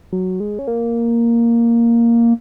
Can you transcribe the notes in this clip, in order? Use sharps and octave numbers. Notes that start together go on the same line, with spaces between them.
F#3
G#3
C#4
A#3